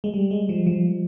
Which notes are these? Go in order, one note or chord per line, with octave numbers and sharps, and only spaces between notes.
G#3
G3
G#3
F3
F3